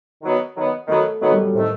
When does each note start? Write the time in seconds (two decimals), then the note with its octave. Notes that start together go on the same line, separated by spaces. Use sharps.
0.22 D#3 F#3 B3
0.56 D#3 F#3 B3
0.88 D#3 F#3 A3 B3
1.20 D#3 F#3 A3 B3
1.32 G3
1.43 F#3
1.53 A2 C3 D#3 A3